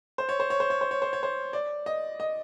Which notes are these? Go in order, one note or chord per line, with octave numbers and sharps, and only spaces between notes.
C5
C#5
C5
C#5
C5
C#5
C5
C#5
C5
C#5
C5
D5
D#5
D#5